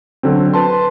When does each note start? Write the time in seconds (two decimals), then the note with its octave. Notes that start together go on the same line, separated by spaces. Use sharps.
0.23 D3 F#3 C4
0.53 B4 A5 C6